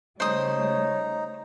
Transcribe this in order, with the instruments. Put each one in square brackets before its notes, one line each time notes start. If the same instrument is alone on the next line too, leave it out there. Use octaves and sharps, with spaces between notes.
[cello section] C#3 G3 A3 [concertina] D#4 [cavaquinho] C5 D#6 [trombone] C#5